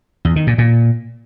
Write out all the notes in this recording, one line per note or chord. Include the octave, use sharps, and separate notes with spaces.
E2
D#3
A#2
A#2